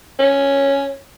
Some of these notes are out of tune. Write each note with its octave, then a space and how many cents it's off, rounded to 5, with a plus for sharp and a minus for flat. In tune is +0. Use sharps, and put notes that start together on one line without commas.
C#4 +0